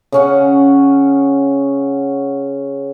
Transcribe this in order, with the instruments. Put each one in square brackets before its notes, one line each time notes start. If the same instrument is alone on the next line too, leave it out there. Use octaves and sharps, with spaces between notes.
[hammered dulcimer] C#3 C#4 F#5